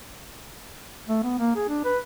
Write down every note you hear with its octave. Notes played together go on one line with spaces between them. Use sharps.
A3
B3
A#3
G#4
D4
B4